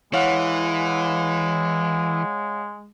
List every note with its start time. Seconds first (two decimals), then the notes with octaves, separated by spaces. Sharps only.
0.13 E3 G#3 C#5 F5 F#5